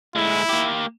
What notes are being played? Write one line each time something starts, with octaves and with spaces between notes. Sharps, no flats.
A2 G#3 E4
A#3 G4